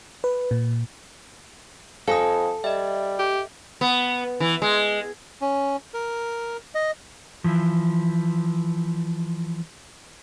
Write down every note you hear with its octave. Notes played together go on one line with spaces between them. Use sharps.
B4
A#2
F2 A4 F5 G#5 D#6
G3 D#5 E5
G4
B3
E3
G#3
C#4
A#4
D#5
E3 F3